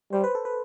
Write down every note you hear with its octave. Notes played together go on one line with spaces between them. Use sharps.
G3 C5
B4
A4
B4